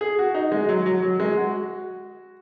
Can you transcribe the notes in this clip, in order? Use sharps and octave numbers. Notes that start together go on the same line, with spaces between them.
G#4
F#4
D#4
G#3
F#3
F#3
F#3
G#3
F#4